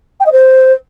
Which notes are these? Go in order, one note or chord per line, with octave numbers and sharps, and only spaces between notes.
G5
D#5
C5